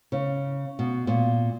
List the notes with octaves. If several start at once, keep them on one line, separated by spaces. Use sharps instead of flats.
C#3
B2
A#2